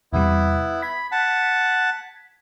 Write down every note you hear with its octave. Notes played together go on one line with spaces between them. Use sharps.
E2 C3 G3 B3 E4
B5 G#6 B6
F#5 A5